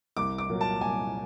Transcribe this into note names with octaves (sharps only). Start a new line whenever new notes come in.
C2 D6
D6
A#2 F#3 A#3
A5
C2 G#5